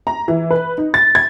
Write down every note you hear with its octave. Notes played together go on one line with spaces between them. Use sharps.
A#5
E3
B4
D#4
A6
G#6